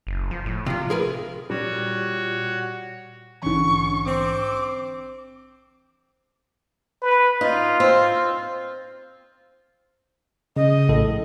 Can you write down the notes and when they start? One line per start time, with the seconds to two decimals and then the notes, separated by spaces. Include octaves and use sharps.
0.07 F#1
0.31 F3
0.46 A2
0.66 C3 F3 F4
0.90 G#4 A#4 B4
1.50 A#2 G3 F#4 C#5
3.43 A#1 G#2 D3 E3 C#4 C#6
4.06 C4 D6
7.02 B4
7.41 D#4 F4
7.80 C4
10.56 C#3 D#5
10.88 A#1 A2 A4